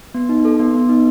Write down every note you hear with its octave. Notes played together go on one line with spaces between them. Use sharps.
B3
D#4
A4
B3
B3
D#4